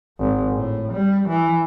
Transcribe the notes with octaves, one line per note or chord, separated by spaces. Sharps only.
G#1
A2
G3
E3